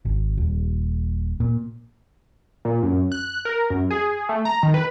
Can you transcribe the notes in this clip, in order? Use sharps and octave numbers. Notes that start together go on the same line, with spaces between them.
G#1
D#1
A#2
A#2
F#2
F#6
A#4
F#2
G#4
A3
A#5
D#3
B4